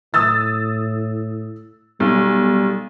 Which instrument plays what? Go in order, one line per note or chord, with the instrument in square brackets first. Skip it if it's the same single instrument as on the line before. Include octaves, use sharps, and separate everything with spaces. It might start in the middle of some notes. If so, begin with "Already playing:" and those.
[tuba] A2 [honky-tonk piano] D#6 E6 A6
[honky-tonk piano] B1 [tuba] G3